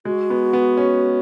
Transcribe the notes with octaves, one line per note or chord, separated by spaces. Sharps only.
G#3 F#4
B3
B3
C#4